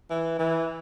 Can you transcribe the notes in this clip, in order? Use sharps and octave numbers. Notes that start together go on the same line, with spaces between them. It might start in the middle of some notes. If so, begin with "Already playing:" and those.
E3
E3